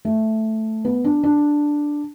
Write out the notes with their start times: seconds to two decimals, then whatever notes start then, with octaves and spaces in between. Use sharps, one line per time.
0.05 A3
0.85 B3
1.04 D4
1.24 D4